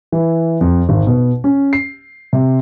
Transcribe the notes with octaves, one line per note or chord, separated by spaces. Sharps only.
E3
F2
G#1
B2
C#4
C7
C3